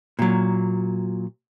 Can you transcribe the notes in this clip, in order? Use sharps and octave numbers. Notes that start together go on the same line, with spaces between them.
A#2 F#3